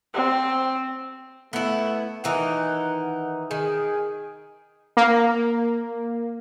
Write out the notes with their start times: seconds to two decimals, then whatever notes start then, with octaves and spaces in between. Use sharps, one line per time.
0.14 C4
1.53 A3 B3 E4
2.24 D#3 E3 D#4 F#5
3.51 D#3 G#4
4.97 A#3